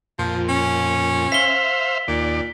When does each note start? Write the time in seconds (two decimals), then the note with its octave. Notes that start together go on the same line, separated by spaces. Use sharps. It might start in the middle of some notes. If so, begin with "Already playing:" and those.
0.19 F2 A#2 F3
0.49 C#4
1.32 C5 E5 F5 B6 G7
2.08 D#2 A#2 D5